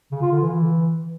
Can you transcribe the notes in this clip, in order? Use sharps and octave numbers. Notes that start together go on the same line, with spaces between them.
C#3
F4
D3
E3